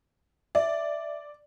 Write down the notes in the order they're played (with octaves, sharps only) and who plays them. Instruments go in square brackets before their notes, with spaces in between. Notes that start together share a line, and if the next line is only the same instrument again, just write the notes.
[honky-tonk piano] D5 [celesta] E5